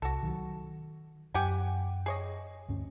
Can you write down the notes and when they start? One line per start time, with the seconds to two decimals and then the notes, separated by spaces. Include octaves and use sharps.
0.02 C2 F#4 A4
0.23 D#3 F3 F#3
1.34 F#2 G4 F#5 G#5
2.06 G#4 C#5 D#5
2.69 D2 G2 C#4